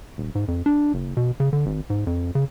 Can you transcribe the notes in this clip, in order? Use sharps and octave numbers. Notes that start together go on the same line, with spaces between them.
D#1
G#2
F2
D4
F#1
B2
C#3
D3
G#1
G#2
F2
C#3